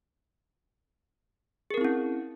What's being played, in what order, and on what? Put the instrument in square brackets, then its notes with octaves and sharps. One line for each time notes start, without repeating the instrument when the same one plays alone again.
[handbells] G#4
A#4
C4
E4
C#4